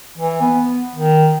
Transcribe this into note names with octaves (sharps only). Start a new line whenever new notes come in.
E3
B3
D#3